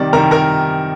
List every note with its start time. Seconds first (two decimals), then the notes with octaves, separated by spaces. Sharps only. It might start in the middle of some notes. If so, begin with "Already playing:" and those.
Already playing: C3 D#3 G3 D5
0.13 C3 D#3 G3 A#4 A#5
0.31 A#4 A#5